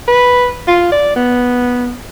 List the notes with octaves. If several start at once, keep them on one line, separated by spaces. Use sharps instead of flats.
B4
F4
D5
B3